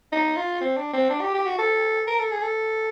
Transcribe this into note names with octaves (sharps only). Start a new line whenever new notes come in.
D#4
F4
C4
D4
C4
D4
G4
G4
F#4
A4
A#4
A4
G#4
A4